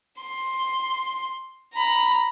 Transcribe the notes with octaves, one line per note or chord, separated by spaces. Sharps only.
C6
A#5 B5